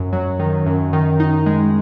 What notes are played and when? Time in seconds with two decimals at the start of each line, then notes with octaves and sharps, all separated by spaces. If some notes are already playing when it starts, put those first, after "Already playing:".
Already playing: F#2
0.13 F#3
0.39 D#3
0.66 F#2
0.93 D#3
1.20 D#4
1.46 G#3